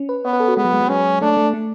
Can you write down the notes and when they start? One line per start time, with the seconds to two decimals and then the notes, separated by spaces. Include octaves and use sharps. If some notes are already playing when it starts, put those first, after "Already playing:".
Already playing: C#4
0.09 B4
0.25 B3 C#5
0.33 B4
0.40 A4
0.48 F#4
0.57 G#3 B3
0.65 F#3
0.73 G#3
0.81 F#3
0.89 G#3 C#4
1.21 A3 D4
1.37 A3
1.53 A3